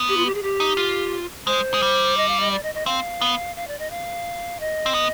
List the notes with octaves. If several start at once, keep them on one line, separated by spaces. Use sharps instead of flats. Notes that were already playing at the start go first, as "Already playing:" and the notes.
Already playing: B3
G4
F4
G4
G#4
G4
D#4
F4
G#3 C5
G#3
G3
D#5
F5
D#5
D5
D#5
D#5
C4 F5
B3
F5
D5
D#5
F5
D#5
C4
B3